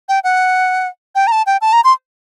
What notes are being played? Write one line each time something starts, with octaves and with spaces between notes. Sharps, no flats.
G5
F#5
G5
A#5
A5
G5
A5
A#5
C6